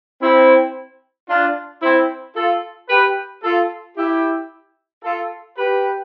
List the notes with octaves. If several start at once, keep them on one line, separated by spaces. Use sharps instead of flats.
C4 E4
D4 F4
C4 E4
F4 A4
G4 B4
F4 A4
E4 G4
F4 A4
G4 B4